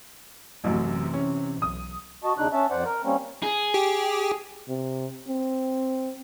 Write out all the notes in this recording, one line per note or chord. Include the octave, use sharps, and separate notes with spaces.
A1 F#2 C3 E3
C#4
B1 D#6
F#4 D#5 A5
D#2 C#3 D4 D#4 F#6
C#4 E5 A5
F2 C5 D5 F#5
A#4
G3 A#3 C4 C#4
G#4
G4
C3
C4